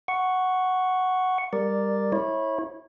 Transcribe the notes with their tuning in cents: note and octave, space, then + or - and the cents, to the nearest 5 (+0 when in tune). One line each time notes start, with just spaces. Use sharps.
F#5 +0 C#6 +0
G3 +20 A#4 +0 D5 +0
E4 -20 C#5 -25